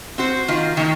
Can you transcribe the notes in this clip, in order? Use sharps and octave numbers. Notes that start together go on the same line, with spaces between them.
C4 F#4 C5
D#3 A#3 F4
D#3 A#3